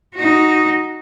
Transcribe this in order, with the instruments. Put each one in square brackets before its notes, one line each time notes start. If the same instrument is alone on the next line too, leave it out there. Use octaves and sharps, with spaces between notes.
[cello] D#4 F#4